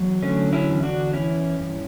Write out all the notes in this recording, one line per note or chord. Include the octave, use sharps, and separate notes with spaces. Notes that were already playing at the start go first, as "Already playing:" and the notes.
Already playing: E2 F#3
D3 A3 C#4
C#4 E4
E2
D4 F#4
E3 C#4 E4
G2